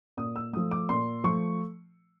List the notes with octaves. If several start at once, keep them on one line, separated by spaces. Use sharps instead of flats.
A#2 D#6
E6
F3 A3 D#6
D6
A#2 C6
F3 A3 C#6